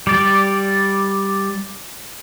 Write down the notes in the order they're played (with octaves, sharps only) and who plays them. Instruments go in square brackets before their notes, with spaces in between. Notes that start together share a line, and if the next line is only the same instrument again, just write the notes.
[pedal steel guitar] G3 D5